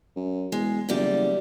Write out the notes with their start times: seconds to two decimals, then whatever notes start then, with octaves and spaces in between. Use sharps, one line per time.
0.16 F#2
0.52 E2 G#3
0.89 F#1 E2 G3 D5